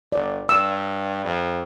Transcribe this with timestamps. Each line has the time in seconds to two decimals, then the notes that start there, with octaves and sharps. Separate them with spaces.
0.12 G1 D5
0.49 G2 E6
1.25 F2